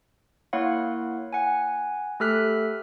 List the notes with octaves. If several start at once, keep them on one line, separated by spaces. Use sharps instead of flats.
A#3 E4 C#5 F5 F#5
F#5 G#5
A3 G4 A4 F6 F#6 B6